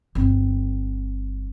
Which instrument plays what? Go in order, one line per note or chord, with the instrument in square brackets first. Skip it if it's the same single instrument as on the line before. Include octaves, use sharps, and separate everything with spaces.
[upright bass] G1 C4